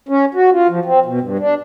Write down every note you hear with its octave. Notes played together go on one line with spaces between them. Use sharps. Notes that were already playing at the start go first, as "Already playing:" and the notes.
C#4
F#4
F4
F3
C4
B2
G2
D4